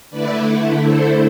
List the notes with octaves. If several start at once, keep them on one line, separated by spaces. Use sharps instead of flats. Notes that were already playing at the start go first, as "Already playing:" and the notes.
D3 A3 E4 B4 D5
A4 C5